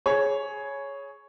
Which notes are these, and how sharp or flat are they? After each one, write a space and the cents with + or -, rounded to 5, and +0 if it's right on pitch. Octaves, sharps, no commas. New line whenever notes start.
G#4 +20 C#5 +0 B5 -10